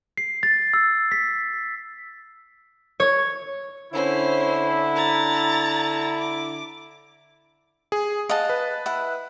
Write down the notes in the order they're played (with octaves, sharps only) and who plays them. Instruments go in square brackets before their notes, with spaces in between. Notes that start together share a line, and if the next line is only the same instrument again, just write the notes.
[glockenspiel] C7
A6
E6
B6
[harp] C#5
[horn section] D3 E4 [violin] C#4 C5
[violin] A#5 A6
D6
[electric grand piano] G#4
[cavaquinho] D#5 F#5 A5 [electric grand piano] F5
[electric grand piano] B4
[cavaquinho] E4 F#5